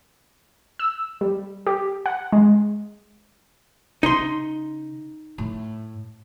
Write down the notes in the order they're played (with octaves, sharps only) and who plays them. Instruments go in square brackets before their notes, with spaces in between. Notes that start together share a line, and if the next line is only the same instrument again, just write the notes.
[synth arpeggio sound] E6
G3
G4
F#5
G#3
[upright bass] C#3 [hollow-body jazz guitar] D#4 C6
[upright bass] A2